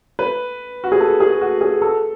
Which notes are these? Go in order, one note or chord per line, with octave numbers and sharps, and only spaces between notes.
B4
F#4
G#4
A4
G#4
F#4
G#4
A4